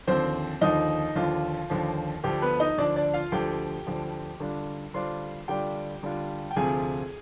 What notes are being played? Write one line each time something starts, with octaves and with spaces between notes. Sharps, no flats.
D#2 D3 F3 C4 C5
D#2 D3 F3 D#4 D#5
D#2 D3 F3 F4
D#2 D3 F3
D2 D3 F3 G4
B3 B4
D#4 D#5
D2 D3 F3 D4 D5
D4 D5
F4 F5
D2 D3 F3 G4 G5
D2 D3 F3
D3 G3 D4 F4
D3 G3 D4 F4 C5 C6
D3 G3 D4 F4 G4 G5
D3 G3 D4 F4
G5
D2 C3 F3 C4 F4 G#4 G#5